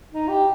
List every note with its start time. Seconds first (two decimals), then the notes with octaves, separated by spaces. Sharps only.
0.13 D#4
0.28 G4